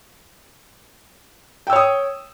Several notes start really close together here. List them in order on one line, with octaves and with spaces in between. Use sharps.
G5 E6 C#5 D#6